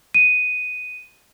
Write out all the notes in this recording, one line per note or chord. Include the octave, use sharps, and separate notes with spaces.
D#7